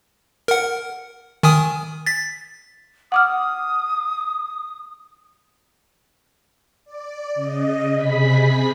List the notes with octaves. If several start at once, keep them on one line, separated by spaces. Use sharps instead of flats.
A#4 F#5
D#3 G#5 D#6
A6 B6
F#5 D6 D#6 F6
D5
C#3 D#5
C3 G#4 B5 B6